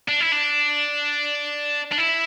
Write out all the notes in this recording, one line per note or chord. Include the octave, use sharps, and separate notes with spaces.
D4
E4
D4
D4
E4